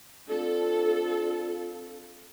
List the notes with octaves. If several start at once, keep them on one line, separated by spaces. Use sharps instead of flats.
C4 D4 F4 A4